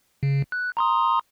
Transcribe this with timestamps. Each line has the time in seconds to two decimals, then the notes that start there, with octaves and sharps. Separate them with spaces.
0.23 C#3
0.52 F#6
0.77 A#5 C6 D#6